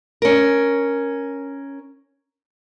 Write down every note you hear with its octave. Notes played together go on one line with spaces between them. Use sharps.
C#4 A#4